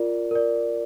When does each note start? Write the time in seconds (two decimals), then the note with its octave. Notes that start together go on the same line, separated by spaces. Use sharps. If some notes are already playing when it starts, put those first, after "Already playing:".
Already playing: F4 A#4 D5
0.31 A#4 D5